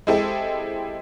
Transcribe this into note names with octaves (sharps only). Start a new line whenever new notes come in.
G#3 C4 E4 G4 A4